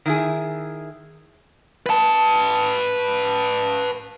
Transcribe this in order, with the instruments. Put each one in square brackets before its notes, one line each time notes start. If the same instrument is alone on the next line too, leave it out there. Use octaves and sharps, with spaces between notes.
[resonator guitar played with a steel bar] D#3 E4 G#4
[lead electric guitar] B4 A5